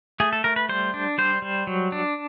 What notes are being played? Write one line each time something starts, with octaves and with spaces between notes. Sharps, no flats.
A3 G#4
A4
A3 A#4
B4
G3 C5
D4
G3 C5
G3
F#3
D4